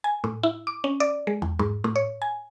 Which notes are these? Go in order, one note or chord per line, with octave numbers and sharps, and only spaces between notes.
G#5
A2
E4
D6
C#4
D5
G#3
E2
G#2
A2
C#5
G#5